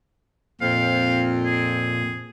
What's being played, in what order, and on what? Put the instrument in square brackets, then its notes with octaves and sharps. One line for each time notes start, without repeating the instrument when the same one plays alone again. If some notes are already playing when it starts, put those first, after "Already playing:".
[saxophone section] F2 C4 [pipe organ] A#2 [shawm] F5
[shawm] G#4